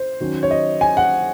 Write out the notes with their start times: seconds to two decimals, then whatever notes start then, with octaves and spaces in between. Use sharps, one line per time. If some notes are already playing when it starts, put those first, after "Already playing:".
Already playing: C5
0.20 D#3 F#3 C#4
0.43 C#5
0.51 D#5
0.81 G#5
0.97 F#5